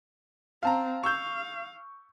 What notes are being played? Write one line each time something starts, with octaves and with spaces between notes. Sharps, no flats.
C4 F5 A5 A#5
F5 C#6 E6 G6